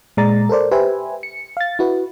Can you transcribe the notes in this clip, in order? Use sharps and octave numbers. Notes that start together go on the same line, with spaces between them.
A#2 G#3 D5 A#5 A6
A4 A#4 C5 D5
G4 B4 C5 E5 G#5
C#7
F5 A6
E4 F#4 B4